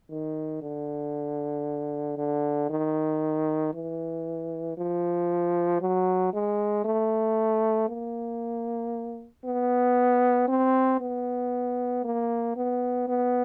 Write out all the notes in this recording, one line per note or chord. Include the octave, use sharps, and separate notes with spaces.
D#3
D3
D3
D#3
E3
F3
F#3
G#3
A3
A#3
B3
C4
B3
A#3
B3
B3